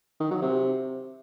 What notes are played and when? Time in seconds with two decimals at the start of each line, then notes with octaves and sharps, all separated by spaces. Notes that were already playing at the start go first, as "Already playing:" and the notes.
0.20 D#3
0.31 F#3
0.42 C3